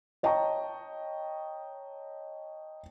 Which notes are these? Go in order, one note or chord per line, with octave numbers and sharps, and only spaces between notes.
C#5 D#5 G5 A5 A#5 C#6